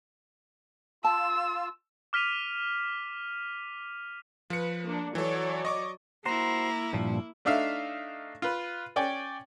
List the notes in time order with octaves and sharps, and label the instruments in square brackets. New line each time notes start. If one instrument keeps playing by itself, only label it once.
[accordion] F4 [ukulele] A5 [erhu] E6
[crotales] D6 F6 B6 D#7 F7
[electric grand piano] F3 C#7 [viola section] B4
[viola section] A#3 D4
[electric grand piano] E3 A4 [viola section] F#3 C#5 D5
[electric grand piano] D#5 C#6 D6
[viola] A#3 E4 [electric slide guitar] F#4 C5 [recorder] A#5
[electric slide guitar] G2 A#2 F3
[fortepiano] A3 D4 D#4 E5 F5
F4 B4
C#4 D5 G5 G#5